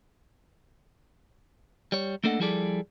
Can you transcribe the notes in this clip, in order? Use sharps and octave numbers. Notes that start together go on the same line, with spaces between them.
G3 C#5
A3 A#3 D4 A4 D#5 F#5
F3 G3 E4 G#4 A4 D5